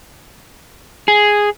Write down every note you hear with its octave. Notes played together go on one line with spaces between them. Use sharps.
G#4